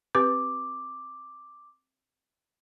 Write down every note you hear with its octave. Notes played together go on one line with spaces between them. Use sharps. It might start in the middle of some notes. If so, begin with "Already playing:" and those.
C4 G4 B4 D6